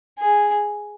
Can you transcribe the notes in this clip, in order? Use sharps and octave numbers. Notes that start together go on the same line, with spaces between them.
G#4